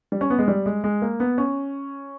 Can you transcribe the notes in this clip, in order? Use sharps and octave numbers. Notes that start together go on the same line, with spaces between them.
G3
C#4
B3
G#3
G3
G#3
G#3
A#3
B3
C#4